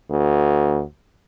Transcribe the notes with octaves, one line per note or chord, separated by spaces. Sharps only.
D2